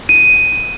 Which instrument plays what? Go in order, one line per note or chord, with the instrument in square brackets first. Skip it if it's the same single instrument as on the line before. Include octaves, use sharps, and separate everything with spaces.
[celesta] D#7